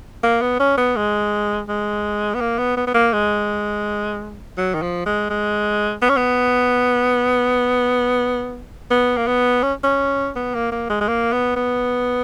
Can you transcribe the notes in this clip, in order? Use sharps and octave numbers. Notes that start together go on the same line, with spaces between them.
A#3
B3
C#4
B3
G#3
G#3
B3
A#3
B3
B3
B3
A#3
G#3
F#3
D#3
F3
G#3
G#3
B3
C#4
B3
B3
A#3
B3
C#4
C#4
B3
A#3
A#3
G#3
G#3
A#3
B3
B3